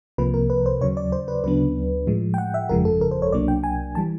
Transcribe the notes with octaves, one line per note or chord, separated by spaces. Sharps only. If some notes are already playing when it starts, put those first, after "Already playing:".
C2 C3 F3 A#3 B4
A#4
B4
C5
D#2 C#3 F#3 C#5
D5
C5
B4
D2 C#3 F#3 B3 D4 B4
A2 F3 G#3
G5
F#5
E5
G1 F2 C#3 F3 G#3 A#4
A4
A#4
C5
C#5
C2 B2 F#3 A#3 D4 D5
G5
G#5
E3 G3 A5